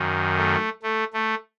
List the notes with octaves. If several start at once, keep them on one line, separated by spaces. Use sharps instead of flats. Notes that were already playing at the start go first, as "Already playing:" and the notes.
Already playing: F#2 D#3
A3
A3
A3